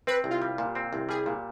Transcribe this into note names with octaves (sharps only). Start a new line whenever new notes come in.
C4 B4
C2
F4
G3
A#2
C4
C2
G3 G#4
A#2